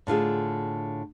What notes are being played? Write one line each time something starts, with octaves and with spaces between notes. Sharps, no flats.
A2 D3 F4 G#4